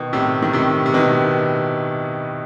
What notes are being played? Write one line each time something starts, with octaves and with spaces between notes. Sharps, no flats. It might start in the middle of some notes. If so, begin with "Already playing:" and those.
Already playing: B2 D#3
A2 C3
D#3
A2 C3
C3
B2 D#3